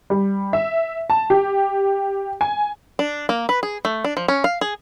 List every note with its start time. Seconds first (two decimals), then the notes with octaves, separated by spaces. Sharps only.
0.10 G3
0.53 E5
1.10 A5
1.30 G4
2.41 G#5
2.99 D4
3.29 A#3
3.49 B4
3.63 G#4
3.85 A3
4.04 D4
4.17 F3
4.28 C#4
4.44 F5
4.61 G#4